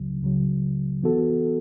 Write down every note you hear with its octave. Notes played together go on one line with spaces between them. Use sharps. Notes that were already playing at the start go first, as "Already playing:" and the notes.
Already playing: C#2 C#3 F#3
C#2 C#3 F#3
E3 B3 F#4 A4